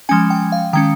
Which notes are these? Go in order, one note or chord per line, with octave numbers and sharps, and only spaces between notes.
F3 G#3 C#4 G#5
G5
F5
D#3 G#3 C#4 G5